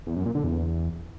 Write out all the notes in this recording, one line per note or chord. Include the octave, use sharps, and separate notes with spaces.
E2
F#2
A#2
D3
E2